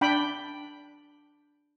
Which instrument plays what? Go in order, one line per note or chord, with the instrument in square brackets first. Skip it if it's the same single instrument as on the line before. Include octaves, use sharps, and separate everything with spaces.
[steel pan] D4 G5 B5